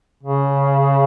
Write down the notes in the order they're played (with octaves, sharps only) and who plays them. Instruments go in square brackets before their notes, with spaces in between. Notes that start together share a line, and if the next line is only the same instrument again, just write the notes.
[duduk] C#3